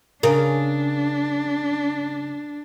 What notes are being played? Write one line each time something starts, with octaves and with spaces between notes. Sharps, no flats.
C#3 D4 A#4